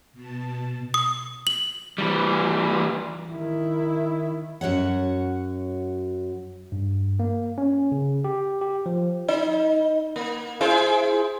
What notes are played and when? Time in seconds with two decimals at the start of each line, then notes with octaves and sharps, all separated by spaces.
0.13 B2 A5
0.94 D#6
1.47 F#7
1.98 E3 G3
3.32 D#3 E4
4.61 F#2 F#4 C#5 F#5
6.72 G2
7.19 A#3
7.58 C#4
7.92 C#3
8.24 G4
8.61 G4
8.86 F3
9.28 D#4
10.16 A#3
10.61 E4 G#4 C5